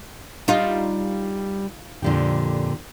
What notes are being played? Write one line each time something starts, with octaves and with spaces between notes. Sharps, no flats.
G3 D#4 F4
F2 A#2 D3 G4